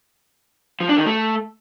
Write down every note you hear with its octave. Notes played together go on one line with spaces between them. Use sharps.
F3
D4
D#3
A3